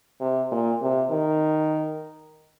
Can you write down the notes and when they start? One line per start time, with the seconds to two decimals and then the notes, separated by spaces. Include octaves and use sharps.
0.21 C3
0.52 A#2
0.81 C3
1.11 D#3